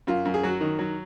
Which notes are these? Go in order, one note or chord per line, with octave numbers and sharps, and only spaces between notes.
F#2 F4
F#2
G#4
F#3 F#4
D#3
F#3